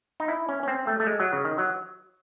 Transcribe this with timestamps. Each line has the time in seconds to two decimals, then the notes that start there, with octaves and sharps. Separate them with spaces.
0.20 D#4
0.28 E4
0.49 C#4
0.63 C#4
0.68 C4
0.87 A3
1.00 A3
1.07 G#3
1.20 F#3
1.33 C#3
1.45 D#3
1.58 F#3